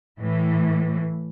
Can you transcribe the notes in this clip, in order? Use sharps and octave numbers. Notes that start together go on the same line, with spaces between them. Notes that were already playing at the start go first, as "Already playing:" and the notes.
A2 E3